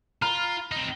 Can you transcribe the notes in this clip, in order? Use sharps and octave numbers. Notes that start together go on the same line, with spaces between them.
F4 A#5 B5 F6
C4 D#4